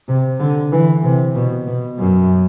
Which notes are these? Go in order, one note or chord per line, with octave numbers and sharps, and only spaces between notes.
C3
D3
E3
C3
B2
B2
F#2